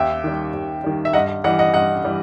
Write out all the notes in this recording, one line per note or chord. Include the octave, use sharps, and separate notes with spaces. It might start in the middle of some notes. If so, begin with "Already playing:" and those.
Already playing: D#2 E5 G5
D#3 G3
D#2
D#3 G3
E5
G2 D#5 F#5
E3 G3 D#5 F#5
D#5 F#5
G2 D#5 F#5
E3 G3